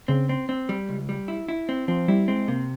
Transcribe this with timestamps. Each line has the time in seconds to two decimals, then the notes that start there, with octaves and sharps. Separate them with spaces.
0.08 C#3 C4
0.29 C4
0.49 C4
0.69 G3
0.89 C#2
1.09 G3
1.28 E4
1.49 E4
1.69 C4
1.88 F3 C4
2.08 G3 E4
2.28 G#3 C4
2.48 C3 A#3